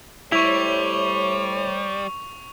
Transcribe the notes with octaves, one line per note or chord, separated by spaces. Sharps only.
G3 A3 E4 C5 C#5 C#6 F7